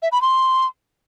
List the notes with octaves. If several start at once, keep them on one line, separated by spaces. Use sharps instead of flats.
E5
B5
C6